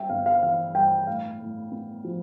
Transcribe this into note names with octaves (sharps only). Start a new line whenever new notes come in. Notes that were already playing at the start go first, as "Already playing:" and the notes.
Already playing: G3 E5 G5
G1 F5
F5
E3 F5
G2 G5
A2 F5
A2
B3
F3